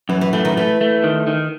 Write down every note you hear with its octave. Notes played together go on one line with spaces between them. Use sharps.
F#2 E3
E3
E3 A3
D#3
E3 A3
A3
D#3
D#3